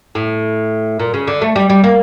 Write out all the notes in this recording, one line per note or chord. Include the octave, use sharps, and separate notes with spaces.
A2
A#2
C#3
D3
A3
G3
G3
A#3